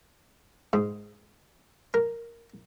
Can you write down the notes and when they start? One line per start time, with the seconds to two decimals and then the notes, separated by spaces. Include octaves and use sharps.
0.73 G#2
1.94 A#4